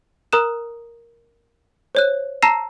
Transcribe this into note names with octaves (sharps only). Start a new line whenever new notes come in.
A#4 A#5 D#6 F#6 E7
C5 C#5 F#6
A5 A#5 E6 A#6 C7 E7